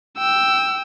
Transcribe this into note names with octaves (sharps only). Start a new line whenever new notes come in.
G5 E6